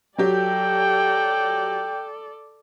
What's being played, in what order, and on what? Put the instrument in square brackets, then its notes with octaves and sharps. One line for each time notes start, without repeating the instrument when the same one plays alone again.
[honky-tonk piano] F#3 G4 [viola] A4 D5 [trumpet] G5